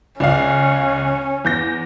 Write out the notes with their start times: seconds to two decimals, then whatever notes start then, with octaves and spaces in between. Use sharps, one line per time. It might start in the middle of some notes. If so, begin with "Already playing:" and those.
0.20 C#2 C#4 D5 F5
1.45 E2 G6 A#6